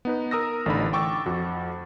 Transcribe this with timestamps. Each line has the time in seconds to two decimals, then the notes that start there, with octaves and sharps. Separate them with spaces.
0.05 B3 D#4 B4
0.31 A#4 D#6 E6 A#6
0.66 A1 D3 D#4 D5 B5
0.93 G5 C#6 D6 E6 A6
1.26 F2 F#4